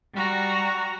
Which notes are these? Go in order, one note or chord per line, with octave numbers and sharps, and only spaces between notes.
G3 F#4 A#5